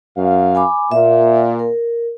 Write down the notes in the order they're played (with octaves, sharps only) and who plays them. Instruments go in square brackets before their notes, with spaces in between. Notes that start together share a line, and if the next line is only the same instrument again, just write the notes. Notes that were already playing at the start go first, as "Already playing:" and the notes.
[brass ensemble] F#2 F5
[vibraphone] G#5 B5 D6
[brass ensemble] A#2 [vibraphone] E5
[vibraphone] A#4